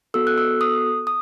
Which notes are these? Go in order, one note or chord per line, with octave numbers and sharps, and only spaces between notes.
B3 F#4 A4 E6
F#6
E6
D#6
D#6